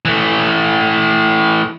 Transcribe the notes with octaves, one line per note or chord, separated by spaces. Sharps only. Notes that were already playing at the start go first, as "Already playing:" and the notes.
E3 A3